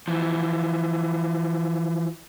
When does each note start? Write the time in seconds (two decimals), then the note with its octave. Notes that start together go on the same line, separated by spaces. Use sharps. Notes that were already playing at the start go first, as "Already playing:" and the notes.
0.08 E3 F3